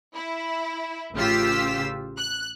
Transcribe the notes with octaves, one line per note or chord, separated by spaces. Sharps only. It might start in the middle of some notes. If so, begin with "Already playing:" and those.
E4
A1 C#3 F4 G4 E6 B6
F#6